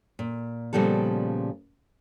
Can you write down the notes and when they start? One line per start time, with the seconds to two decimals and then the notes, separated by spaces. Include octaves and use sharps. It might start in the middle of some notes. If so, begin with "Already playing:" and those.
0.19 A#2
0.73 A#2 C#3 F3 G3 B3 A4